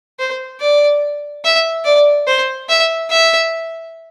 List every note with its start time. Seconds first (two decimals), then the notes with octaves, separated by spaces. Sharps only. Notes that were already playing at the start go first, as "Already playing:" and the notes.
0.19 C5
0.61 D5
1.45 E5
1.85 D5
2.27 C5
2.69 E5
3.11 E5